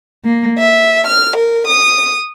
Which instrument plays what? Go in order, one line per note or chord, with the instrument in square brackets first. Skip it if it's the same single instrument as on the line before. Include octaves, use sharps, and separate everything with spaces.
[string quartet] A#3
E5
F6
A#4
D#6